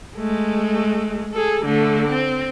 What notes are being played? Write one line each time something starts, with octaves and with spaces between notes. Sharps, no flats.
G#3 A3
G#4 A4
D3 A3
C4